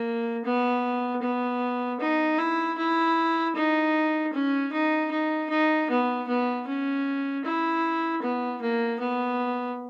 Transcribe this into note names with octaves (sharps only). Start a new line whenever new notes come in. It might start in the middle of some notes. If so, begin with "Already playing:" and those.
Already playing: A#3
B3
B3
D#4
E4
E4
D#4
C#4
D#4
D#4
D#4
B3
B3
C#4
E4
B3
A#3
B3